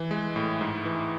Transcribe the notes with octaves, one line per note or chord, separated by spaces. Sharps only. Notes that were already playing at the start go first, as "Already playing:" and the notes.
Already playing: E3
G#3
A2
G#2
E3